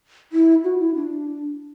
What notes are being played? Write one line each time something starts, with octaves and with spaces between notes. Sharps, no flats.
E4
F#4
E4
D4